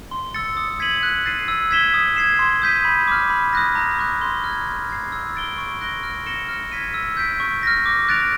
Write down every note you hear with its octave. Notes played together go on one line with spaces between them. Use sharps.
C6
E6 A6 C#7
D#6
G#6 B6 D#7 F#7
F#6
A6 C7 D#7
E6
G#6 B6 E7 G7
D#6
G#6 C7 E7
C6
D#6 G6 B6 D#7
B5
D6 F6
B5
D#6 F#6 A#6
A#5
C#6 F#6
C6
F6 G#6
F6
G#6 C7
E6
A6 D7 G7
C#6
F#6 A#6 D7 G7
F6
A#6 C#7 E7 G7
F6
G#6 B6 D#7
E6
G6 B6 D7
C#6
F6 A#6
D6
F#6 A6 D7 F7